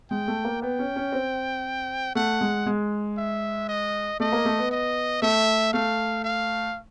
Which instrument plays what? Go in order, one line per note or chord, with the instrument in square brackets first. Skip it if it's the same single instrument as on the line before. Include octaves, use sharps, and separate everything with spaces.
[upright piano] G#3 [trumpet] G5
[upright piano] A3
A#3
[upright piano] B3 [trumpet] G5
[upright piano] C#4
C#4
C4
[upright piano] A3 [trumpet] F#5
[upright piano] G#3
G#3
[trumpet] E5
D#5
[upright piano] A3 [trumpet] D#5
[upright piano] A#3
A3
B3
[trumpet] D#5
[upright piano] A3 [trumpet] E5
[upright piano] A3 [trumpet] F5
[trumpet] F5